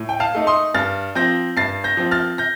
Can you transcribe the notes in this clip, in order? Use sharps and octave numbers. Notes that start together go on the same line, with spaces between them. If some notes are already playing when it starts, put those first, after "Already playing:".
Already playing: A2
G5
F5 A5
A3 D#4
C6 D#6
G2 F6 A6
F3 C4 G6 A#6
G2 A6 C7
G6 A#6
F3 C4
F6 A6
G6 A#6